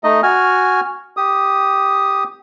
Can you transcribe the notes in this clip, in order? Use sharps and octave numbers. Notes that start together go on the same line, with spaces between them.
A3 D#4 D#5
F#4 G#5 F6
G4 D#6